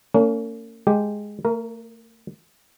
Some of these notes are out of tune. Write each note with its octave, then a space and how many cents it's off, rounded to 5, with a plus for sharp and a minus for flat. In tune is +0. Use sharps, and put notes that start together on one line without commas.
A#3 -40 C#4 +25
G#3 +0 G4 +0
A3 +40 A#4 +0